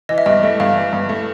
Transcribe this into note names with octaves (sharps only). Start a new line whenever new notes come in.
E3 D#5
E5
G2 D#5
A3
G2 F5
E3
G2
A3